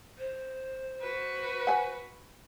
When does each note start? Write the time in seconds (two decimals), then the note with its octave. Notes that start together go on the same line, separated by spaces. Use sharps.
0.19 C5
1.02 F#4 B4
1.67 F#5 G#5